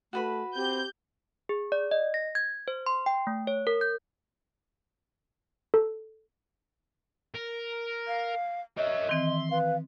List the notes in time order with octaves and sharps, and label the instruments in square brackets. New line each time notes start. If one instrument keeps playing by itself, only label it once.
[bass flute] A3 [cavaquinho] F#4 B4 B5
[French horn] C4 [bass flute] G4 [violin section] G6
[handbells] G#4
D5
D#5
A#6
G#6
C5
C6
G5
A3
C#5
A#4
G6
A4
[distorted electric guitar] A#4
[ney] F5
[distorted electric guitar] A#4 C#5 [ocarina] D#5 [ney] E5
[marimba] D#3 E3 C4 [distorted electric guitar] C6
[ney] B4 [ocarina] F5